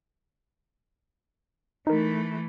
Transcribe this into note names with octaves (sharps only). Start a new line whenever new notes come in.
E3 A3 D#4 A#4